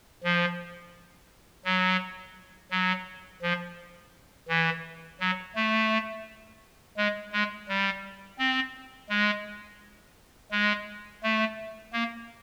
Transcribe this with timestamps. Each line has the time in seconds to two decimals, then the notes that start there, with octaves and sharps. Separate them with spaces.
0.24 F3
1.65 F#3
2.71 F#3
3.42 F3
4.48 E3
5.20 F#3
5.55 A3
6.97 G#3
7.33 G#3
7.68 G3
8.39 C4
9.10 G#3
10.51 G#3
11.23 A3
11.93 A#3